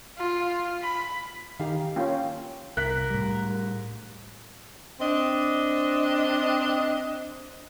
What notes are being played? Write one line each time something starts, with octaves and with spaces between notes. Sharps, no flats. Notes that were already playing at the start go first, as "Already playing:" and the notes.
F4
B5
D#3 D#4 G4 F5
A#3 C#4 F4 C#5 F5 G5
C2 A#4 F#6 B6
A2 G3
C4 D4 D#5